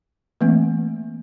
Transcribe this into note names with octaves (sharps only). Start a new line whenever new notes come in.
E3 A3 A#3 C4